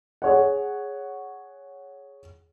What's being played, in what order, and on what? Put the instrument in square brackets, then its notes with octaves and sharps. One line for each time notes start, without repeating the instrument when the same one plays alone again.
[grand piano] G#4 C#5 F#5